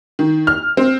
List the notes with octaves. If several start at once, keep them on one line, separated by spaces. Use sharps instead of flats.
D#3
F6
C4